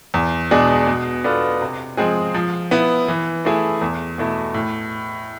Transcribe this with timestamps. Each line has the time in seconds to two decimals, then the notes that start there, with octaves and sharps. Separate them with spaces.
0.14 E2
0.51 B2 G#3 D4 G#4
0.87 B2
1.24 B3 D4 F4 A4
1.61 C3
1.97 F3 G#3 C4 G#4
2.34 F3
2.71 B3 E4
3.08 E3
3.45 A3 E4 G#4
3.81 E2
4.18 B2 A3 E4
4.54 A2